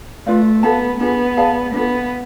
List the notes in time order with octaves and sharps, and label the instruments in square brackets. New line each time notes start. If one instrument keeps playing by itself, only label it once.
[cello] A3 [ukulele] F4 B4 D5 F5
[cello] B3 [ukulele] F#4 A4 F5 A5
[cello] B3 [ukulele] D4 F4 G#4
[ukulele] G#4 D5 F5 A5
[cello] B3 [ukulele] D4 F4 A4